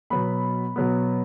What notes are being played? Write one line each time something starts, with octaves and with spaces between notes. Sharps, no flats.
B2 F#3 B3 B5
B2 F#3 B3